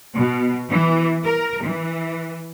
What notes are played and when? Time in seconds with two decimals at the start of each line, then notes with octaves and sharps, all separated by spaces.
0.15 B2
0.71 E3
1.24 A#4
1.63 E3